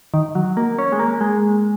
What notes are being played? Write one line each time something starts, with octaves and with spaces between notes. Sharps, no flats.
D#3
F#3
A#3
C#4
G#3
A#3
G#3